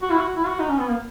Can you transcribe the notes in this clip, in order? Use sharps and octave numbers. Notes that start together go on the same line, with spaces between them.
F#4
E4
F#4
E4
F#4
D#4
C#4
B3
A#3